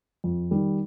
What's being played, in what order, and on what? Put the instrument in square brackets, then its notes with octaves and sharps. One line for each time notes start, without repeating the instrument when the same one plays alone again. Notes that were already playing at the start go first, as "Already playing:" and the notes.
[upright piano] F2
D#3 G3